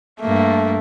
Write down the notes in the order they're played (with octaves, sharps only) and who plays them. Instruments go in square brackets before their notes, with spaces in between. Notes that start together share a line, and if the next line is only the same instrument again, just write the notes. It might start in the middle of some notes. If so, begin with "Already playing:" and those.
[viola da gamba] G2 A#3 [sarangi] A3